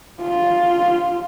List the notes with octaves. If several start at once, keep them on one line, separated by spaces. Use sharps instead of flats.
F4